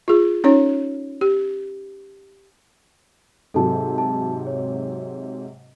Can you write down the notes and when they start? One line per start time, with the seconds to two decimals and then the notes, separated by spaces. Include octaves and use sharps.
0.08 F4 G#4
0.44 C#4 D#4 C#5
1.21 G4
3.54 G#2 C3 F#3 A4 A5
3.98 A5
4.47 C#5